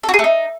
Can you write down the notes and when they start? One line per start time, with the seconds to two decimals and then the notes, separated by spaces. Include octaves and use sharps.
0.03 A4
0.09 F#4
0.14 G#4
0.19 A3
0.24 D#4